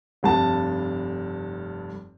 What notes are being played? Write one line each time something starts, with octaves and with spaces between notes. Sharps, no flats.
F1 G2 A5